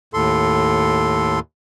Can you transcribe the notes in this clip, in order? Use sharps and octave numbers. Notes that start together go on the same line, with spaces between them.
D#2 A2 A4 C6